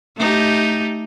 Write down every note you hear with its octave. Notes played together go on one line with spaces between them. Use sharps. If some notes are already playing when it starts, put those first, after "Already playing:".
A3 D#4 G4